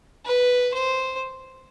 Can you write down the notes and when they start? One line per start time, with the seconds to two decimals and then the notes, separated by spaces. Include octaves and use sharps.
0.25 B4
0.74 C5